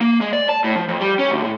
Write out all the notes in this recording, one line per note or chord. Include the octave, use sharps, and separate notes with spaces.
A#3
G#3
D5
A5
A2
F3
F2
G3
C#4
D2
A2